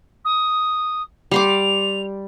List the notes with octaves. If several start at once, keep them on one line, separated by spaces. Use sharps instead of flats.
D#6
G3 C6 D6 F7